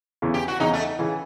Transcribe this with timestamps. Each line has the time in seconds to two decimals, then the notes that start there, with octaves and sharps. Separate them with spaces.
0.22 E2 C#3 E3
0.34 G4
0.48 F#4
0.60 E2 C#3 E3 D#4
0.74 A3
0.99 C#3 E3